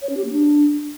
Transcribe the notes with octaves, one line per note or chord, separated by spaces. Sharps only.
C#5
C#4
G4
A#3
D4